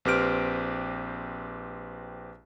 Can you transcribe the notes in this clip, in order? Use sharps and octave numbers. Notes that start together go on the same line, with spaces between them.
A#1 C4 G4 B4 F6 D7